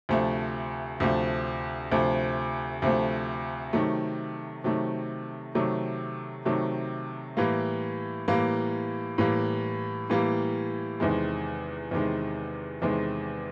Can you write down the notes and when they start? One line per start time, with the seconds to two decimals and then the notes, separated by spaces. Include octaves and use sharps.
0.09 D2 C3 F3 A3
1.00 D2 C3 F3 A3
1.91 D2 C3 F3 A3
2.82 D2 C3 F3 A3
3.73 C3 D#3 F#3 A3
4.64 C3 D#3 F#3 A3
5.55 C3 D#3 F#3 A3
6.45 C3 D#3 F#3 A3
7.37 A2 E3 G3 A#3
8.28 A2 E3 G3 A#3
9.18 A2 E3 G3 A#3
10.10 A2 E3 G3 A#3
11.00 E2 C3 D#3 G#3
11.91 E2 C3 D#3 G#3
12.82 E2 C3 D#3 G#3